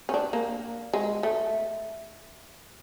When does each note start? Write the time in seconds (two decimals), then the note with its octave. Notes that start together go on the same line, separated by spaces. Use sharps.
0.09 C#4
0.14 D4
0.33 A#3
0.93 G#3
1.23 A3